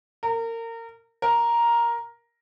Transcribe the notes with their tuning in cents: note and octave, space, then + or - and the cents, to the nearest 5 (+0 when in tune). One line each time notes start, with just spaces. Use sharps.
A#4 -30
A#4 +5